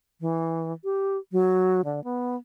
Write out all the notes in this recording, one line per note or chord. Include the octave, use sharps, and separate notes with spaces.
E3
G4
F#3
D3
B3